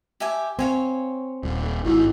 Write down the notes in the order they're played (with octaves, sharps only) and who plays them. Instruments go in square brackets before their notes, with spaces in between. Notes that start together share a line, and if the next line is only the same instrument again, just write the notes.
[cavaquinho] G4 E5 G#5
[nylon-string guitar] C4 [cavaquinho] C#5 F5 G#5
[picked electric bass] D#1
[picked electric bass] G#1 [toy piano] E4 G4 E6